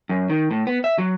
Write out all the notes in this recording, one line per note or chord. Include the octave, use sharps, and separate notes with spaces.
F#2
D#3
A2
B3
E5
F#3